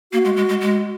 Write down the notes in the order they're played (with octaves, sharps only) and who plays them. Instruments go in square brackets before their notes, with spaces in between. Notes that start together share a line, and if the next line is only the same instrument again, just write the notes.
[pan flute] A#3 [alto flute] F#4
[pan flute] G#3
G#3
G#3
G#3